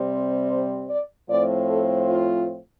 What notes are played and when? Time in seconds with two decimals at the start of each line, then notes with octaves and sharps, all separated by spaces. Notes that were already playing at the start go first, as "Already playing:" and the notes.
Already playing: C3 G3 C4
0.48 C5
0.88 D5
1.28 A2 F3 C4 D5
1.69 A4
2.09 F4